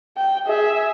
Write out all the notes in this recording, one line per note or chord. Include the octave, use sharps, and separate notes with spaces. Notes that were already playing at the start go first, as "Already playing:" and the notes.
G5
G#4 E5